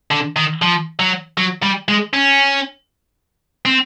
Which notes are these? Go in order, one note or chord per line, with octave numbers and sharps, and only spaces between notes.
D3
D#3
F3
F#3
F#3
G3
G#3
C#4
C4